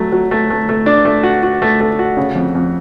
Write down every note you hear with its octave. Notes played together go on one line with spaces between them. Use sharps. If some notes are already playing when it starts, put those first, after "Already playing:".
Already playing: F#3 A3
F#3
A3
A3
A3
D4
A3
F#4
F#4
A3
A3
F#4
C#3
F2
F2